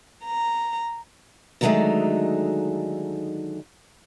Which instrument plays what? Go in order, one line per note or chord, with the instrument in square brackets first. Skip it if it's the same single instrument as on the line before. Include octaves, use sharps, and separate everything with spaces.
[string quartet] A#5
[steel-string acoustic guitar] D3 D#3 F#3 G#3 A3 D#4